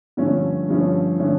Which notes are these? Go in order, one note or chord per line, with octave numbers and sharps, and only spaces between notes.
G2 D3 F3 A3 C#4
G2 D3 F3 A3 C#4
D3 F3 A3 C#4